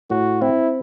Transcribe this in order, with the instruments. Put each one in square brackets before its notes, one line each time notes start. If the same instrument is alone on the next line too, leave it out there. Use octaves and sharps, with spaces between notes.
[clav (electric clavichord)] A2 [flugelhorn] F#4
[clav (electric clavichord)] C4 [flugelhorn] E4